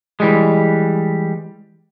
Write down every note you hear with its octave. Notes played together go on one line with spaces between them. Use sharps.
E3 G3 G#3